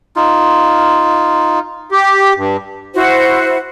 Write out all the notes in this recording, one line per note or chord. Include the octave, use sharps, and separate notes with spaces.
D#4 F4
G4
G2
E4 F#4 C5